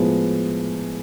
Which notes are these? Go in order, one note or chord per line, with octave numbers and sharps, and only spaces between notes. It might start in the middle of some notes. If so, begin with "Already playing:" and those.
Already playing: A2 F3 G#3 B3